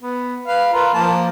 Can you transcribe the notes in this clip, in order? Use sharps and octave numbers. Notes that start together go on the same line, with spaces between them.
B3
B4 F5
F4 A#4 B4
F3 A#3 A5